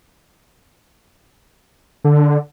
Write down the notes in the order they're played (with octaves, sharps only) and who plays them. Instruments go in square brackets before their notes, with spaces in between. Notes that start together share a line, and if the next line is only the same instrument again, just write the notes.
[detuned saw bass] D3